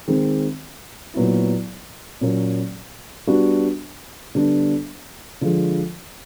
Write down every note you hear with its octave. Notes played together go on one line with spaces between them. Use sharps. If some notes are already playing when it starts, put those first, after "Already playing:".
D#3 G#3 C4
A#2 F#3 B3 E4
A#2 F#3 A#3 C#4
G3 B3 D4 F#4
D3 G3 B3 D4
D3 F3 G#3